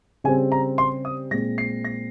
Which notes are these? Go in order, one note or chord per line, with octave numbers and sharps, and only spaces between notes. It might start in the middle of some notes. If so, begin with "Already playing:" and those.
C#3 G3 C4 G#5
A#5
C6
D#6
A#2 G#3 C4 A#6
C7
A#6